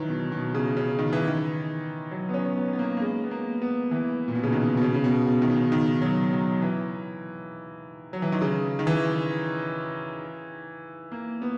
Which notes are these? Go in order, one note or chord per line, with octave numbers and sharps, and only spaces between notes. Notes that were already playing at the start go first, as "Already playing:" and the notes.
Already playing: D#3 E3 F#3
B2
B2
C#3
C#3
D#3
E3
D#3
F#3
B3
C#4
B3
B3
A#3
A#3
G#3
B3
A#3
B3
E3
A#2
B2
C#3
D#3
B2
C#3
C#3
B2
B2
D#3
C#3
D#3
F#3
F#3
E3
F#3
E3
D#3
C#3
D#3
E3
A#3
B3